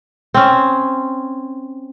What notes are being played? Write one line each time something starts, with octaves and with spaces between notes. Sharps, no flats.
C4 C#4